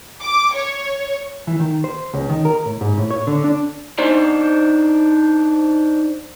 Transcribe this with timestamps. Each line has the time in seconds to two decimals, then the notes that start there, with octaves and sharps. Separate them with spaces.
0.22 D6
0.53 C#5
1.47 E3
1.60 D#3
1.84 C5
2.13 C#2
2.29 D#3
2.45 A#4
2.65 A2
2.81 G#2
2.98 A2
3.11 C#5
3.27 D3
3.44 D4
3.98 D4 D#4 C5